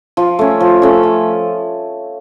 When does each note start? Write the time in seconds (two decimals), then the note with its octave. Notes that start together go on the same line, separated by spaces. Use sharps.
0.17 F3
0.39 A3 C#4
0.61 F3
0.82 A3 C#4
1.03 F3